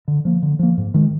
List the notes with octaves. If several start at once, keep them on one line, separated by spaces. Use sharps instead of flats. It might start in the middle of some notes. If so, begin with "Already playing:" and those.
D3
F3 A#3
D3
F3 A#3
G#2
D#3 G#3